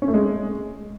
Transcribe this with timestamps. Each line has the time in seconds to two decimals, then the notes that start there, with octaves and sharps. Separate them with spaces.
0.02 C#4
0.08 A3
0.14 G#3